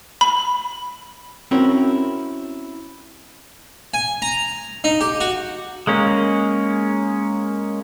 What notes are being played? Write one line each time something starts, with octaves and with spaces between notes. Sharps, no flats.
B5
C4 C#4 E4 F#4 A#4
G#5
A#5
D#4
G4
F#4
G#3 A#3 C#4